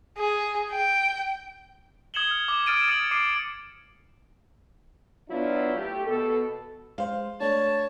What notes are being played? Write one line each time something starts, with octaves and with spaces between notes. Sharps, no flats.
G#4
G5
D#6 G#6 C#7 E7 F#7 G7
F6
D6
D#6 F6 A6 D7 D#7
D#6 A6 C#7 D#7 F#7
D6 C7 D7 D#7
F#3 B3 D4 E4 F4
A3 G4
B2 A4
G#3 C5 F5
A3 D4 C#5 A5